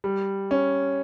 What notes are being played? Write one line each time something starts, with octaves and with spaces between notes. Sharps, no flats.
G3
C#4